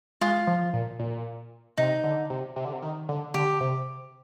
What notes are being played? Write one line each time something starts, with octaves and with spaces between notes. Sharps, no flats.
G#3 F4
F3
A#2
A#2
C3 D#4
D3
C3
C3
D3
C3
D#3
D3
D3 G4
C3